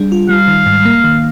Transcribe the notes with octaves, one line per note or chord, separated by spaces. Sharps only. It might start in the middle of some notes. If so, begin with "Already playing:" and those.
Already playing: G3 D4 G#4
F4
G3 F5
D#3
G#2
A#3
D#3